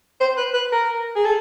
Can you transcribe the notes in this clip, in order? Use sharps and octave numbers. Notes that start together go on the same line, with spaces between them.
C5
B4
B4
A#4
G#4
A4